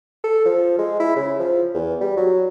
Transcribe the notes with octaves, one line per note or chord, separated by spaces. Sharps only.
A4
F3
G#3
E4
C#3
F3
E2
G3
F#3